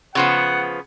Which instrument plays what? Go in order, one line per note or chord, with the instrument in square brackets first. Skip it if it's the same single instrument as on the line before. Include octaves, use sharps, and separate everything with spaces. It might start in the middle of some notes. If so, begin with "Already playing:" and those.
[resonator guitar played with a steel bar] C#3 F3 B3 [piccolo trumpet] F#5